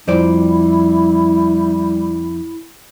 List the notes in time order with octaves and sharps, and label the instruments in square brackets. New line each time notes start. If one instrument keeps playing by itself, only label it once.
[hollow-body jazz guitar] F2 C5 D5 [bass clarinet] G3 [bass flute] E4